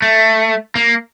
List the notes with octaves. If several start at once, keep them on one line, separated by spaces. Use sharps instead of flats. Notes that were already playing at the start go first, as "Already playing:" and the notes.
A3
A#3